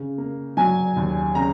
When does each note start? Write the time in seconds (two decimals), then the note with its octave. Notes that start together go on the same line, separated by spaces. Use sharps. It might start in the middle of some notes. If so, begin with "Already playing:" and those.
Already playing: C#3
0.18 A#3
0.57 F#3 G#5
0.96 D#2
1.35 C#3 A#5